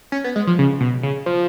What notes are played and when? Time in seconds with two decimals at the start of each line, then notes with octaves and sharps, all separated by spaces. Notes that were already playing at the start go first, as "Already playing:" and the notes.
0.12 C#4
0.24 B3
0.36 G#3
0.47 F3
0.59 C#3
0.80 B2
1.03 C#3
1.26 F3